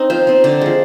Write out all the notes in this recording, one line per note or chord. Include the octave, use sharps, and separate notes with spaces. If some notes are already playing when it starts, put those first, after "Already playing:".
Already playing: C4 D#4
F3 C5
C4 D#4
D3 D5
F3 G#3